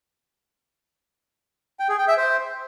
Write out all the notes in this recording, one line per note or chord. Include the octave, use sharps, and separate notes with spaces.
G5
G#4
G5
E5
C5